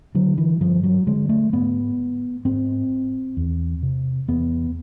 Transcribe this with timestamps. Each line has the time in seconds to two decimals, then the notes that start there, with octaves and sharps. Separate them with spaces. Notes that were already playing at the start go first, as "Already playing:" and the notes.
0.15 D3 F#3
0.38 E3
0.61 G2 F3
0.83 F#3
1.07 D3 G#3
1.29 A3
1.53 G#2 B3
2.45 G#2 C4
3.37 E2
3.83 C3
4.28 E2 B3